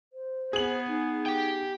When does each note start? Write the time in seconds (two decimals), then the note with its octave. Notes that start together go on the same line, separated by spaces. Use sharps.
0.13 C5
0.53 B3 G#4 F#7
0.87 D#4
1.26 G4 G5